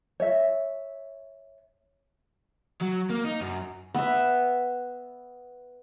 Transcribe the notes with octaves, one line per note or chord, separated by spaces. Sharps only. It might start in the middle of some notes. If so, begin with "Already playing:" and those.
C#5 E5
F#3
A#3
D#4
F#2
B3 E5